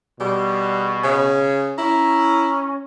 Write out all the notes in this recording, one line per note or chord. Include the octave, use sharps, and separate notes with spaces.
B2 G3 G#4
C#3 G#5
C#4 E4 A#5